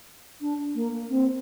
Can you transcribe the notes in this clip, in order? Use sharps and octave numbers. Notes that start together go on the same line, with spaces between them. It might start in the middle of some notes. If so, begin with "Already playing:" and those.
D4
A#3
C4